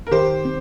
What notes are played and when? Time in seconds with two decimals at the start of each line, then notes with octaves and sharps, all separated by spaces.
0.07 A#4
0.11 D#3 G4 C5
0.45 C4